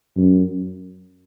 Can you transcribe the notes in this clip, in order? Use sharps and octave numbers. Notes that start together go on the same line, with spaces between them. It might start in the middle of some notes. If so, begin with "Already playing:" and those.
F#2